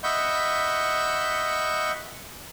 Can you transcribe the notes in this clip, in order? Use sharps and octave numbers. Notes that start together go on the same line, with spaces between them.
D#5 E5 F#5 B5 C#6 G6